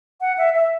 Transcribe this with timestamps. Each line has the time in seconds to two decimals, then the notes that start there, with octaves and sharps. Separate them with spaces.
0.21 F#5
0.38 E5
0.55 E5